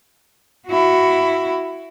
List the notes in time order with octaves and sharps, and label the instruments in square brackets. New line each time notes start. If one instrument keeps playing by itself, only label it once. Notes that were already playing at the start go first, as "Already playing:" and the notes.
[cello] E4 F#4